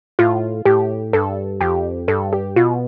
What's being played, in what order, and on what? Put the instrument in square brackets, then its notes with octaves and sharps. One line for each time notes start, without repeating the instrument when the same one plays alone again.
[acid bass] A2 [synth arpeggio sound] F4
[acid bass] A2 [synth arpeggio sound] G4
[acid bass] G2 [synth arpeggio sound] A4
[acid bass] F2 [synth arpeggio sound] G4
[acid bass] G2 [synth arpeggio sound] A4
[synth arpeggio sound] G4
[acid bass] B2 [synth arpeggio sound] F4